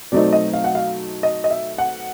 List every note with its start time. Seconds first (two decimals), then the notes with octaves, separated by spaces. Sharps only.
0.12 B2 F#3 A3 C4 D#4 D5
0.33 D#5
0.53 F5
0.64 F#5
0.75 F5
1.23 D#5
1.44 D#5
1.51 E5
1.78 F#5